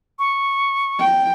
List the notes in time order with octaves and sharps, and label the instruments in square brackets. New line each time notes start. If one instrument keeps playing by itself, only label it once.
[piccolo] C#6
[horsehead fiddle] G5